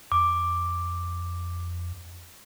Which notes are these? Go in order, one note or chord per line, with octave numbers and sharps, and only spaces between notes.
F2 D6